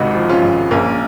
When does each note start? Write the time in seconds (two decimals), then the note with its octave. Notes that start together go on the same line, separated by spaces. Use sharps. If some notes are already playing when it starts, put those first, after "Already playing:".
Already playing: G#1 C#2 C3 D#4 F#4
0.15 F3
0.29 C#4 F4
0.42 G#1
0.71 A#1 A#3 C#4